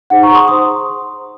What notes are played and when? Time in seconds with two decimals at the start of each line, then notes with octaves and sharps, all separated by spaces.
0.10 D#4 G#4 C5 F#5
0.23 A#5 C#6
0.35 C6 D#6
0.48 D#4 G#4 C5 C6 D#6